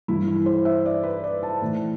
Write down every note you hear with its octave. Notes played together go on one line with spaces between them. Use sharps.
G2 E3 E4
E4
C5
E5
D5
B4
D5
A5
A2 E3